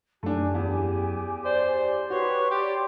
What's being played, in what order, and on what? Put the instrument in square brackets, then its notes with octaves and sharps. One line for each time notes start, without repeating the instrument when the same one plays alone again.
[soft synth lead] F#2 [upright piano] A3 D4 [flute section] G4 G#5
[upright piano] E2
[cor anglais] C5 [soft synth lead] D5
[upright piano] F#4 [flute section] G4 B4 [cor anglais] C#5 [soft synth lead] C6
[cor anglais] G4 [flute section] D5